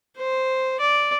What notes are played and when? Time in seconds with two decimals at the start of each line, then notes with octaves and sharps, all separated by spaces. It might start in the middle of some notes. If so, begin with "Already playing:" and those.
0.17 C5
0.80 D5